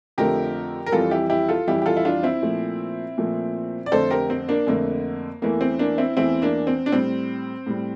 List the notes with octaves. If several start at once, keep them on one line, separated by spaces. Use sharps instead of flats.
F2 D3 F3 A3 G4 A#4
A#4
F2 E3 G3 F4 A4
E4 G4
E4 G4
F4 A4
F2 E3 G3 E4 G4
G4
F4 A4
E4
D4 F4
C4 E4
A#2 F3 A3
A#2 F3 A3
D5
F2 D3 A3 A4 C5
G4 A#4
C4
A#3 D4
F2 D3 A3 A#3
E2 E3 A3 A#3
C4
A#3 D4
C4 E4
E2 E3 A3 C4 E4
A#3 D4
C4
D4
A2 G3 C4
A2 G3